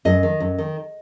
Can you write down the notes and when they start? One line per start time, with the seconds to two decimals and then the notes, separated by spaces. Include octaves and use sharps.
0.05 F#2 D#5
0.23 D#3
0.40 F#2
0.58 D#3